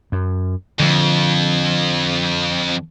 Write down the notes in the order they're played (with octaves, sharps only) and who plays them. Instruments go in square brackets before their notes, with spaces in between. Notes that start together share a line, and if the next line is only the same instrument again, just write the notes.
[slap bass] F#2
[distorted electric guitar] F2 [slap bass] D3 F3